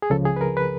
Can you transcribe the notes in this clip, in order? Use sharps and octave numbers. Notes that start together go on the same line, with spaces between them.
G#4
C#2 C#3 F3 A4
G#4
B4
A#4
B4